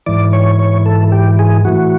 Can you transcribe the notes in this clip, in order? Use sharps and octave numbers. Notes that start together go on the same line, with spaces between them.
G#2 E3 D5
C#5
C#5
A4
G4
G#4
A2 E3 F#4